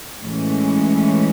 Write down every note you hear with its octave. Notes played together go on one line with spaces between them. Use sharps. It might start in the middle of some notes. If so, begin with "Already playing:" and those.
A2 E3 G#3 C#4